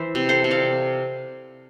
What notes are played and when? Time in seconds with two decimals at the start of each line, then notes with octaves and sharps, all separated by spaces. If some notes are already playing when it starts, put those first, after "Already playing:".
Already playing: E3 C5 E5
0.15 C3
0.29 A4 C5
0.44 C3
0.51 D5 F5